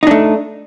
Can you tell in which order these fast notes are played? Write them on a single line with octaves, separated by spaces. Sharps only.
D#4 D4 A3